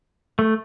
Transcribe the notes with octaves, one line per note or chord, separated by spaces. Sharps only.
A3